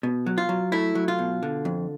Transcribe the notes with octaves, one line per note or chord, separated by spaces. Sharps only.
B2
F#3
F4
F#3
A3 E4
F#3
F4
B2
D3
F2